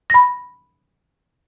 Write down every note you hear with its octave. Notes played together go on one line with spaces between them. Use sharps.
B5 A#6